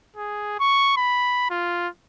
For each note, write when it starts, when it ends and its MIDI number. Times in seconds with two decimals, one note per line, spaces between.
0.17 0.59 68
0.60 0.96 85
0.97 1.47 83
1.50 1.88 65